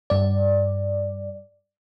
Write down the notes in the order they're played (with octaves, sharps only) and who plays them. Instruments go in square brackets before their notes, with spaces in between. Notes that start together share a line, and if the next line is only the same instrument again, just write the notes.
[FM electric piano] G2 D5